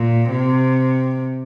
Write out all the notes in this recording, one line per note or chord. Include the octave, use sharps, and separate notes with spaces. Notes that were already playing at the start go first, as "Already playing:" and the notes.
Already playing: A#2
C3